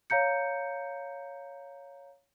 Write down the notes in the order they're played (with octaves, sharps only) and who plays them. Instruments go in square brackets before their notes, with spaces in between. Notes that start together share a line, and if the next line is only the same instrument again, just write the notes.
[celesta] C#5 F5 A#5 G6 C#7